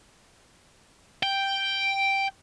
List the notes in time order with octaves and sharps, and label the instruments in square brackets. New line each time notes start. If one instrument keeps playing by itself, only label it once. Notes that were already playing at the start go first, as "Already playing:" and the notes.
[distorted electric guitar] G5